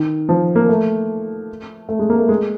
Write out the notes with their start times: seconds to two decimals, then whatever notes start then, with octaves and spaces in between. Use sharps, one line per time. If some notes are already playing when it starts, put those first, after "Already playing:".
Already playing: D#3
0.29 F3
0.55 A#3
0.69 A3
1.89 A3
1.99 G#3
2.10 A#3
2.19 A3
2.29 G#3